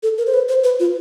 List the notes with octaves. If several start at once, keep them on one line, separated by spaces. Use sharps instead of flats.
A4
A#4
C5
B4
C5
B4
F4